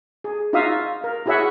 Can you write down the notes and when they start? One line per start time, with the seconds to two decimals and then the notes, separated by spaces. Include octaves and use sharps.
0.24 G#4
0.53 D#4 F4 F#4 E5 F5 D#6
1.04 A#4
1.26 E4 F#4 G#4 C#5 E5 F#5